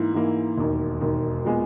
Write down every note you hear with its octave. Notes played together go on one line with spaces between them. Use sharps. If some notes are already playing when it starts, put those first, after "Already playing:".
Already playing: G#2 E3 A#3 E4
G#2 E3 A#3 E4
E1 D#2 D#3
E1 D#2 D#3
A#2 G#3 B3